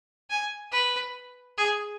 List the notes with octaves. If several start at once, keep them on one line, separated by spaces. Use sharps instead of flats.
G#5
B4
G#4